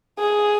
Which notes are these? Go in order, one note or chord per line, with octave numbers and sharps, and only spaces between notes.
G#4